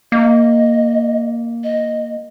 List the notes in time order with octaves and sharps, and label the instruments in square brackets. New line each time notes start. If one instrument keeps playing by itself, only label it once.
[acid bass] A#3 [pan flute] D#5
[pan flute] D#5